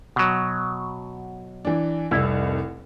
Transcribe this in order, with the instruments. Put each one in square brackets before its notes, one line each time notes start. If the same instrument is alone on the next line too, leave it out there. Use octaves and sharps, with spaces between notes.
[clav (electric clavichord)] B2 F#3
[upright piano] E3 D4
[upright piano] F1 C2 [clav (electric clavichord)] E4